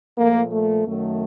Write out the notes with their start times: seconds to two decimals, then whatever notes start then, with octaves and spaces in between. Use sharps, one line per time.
0.18 A#2 F3 A3 A#3
0.52 A3
0.85 F#2 D#3 F#3 A3